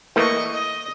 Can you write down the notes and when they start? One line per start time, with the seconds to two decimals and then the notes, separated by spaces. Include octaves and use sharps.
0.16 E3 A3 A#3 D#5 C#6
0.54 D#5